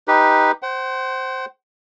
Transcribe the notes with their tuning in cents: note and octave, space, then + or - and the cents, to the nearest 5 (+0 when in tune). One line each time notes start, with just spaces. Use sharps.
D#4 +0 G4 +0 B4 -5
C5 +0 F#5 +45